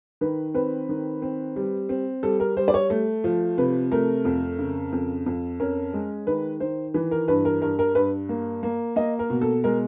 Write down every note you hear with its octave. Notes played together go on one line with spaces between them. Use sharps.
D#3 B4
C4 B4
D#3
C4
G3
C4
G3 A4
A#4
G3 C5
D5
C#5
A3
F3
C3 B4
A3 A#4
F2
C#3
F2
F2
C#4 A#4
G#3
D#3 B4
D#3 C5
E3 B4
A#4
G2 B4
A#4
G2 A#4
A#4
G2 B4
A#3
A#3
A#3 D#5
A#4
B2
A4
G#3 A#4